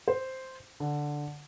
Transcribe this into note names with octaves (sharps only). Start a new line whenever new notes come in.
C5
D3